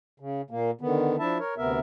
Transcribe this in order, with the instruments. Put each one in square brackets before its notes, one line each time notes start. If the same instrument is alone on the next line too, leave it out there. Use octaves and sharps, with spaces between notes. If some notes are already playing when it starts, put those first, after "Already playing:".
[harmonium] C#3
A#2 A#3
D3 D#3 B3
F3 D4 E4 E5 A5
A#4 C#5
D2 C3 B3 A#4 E5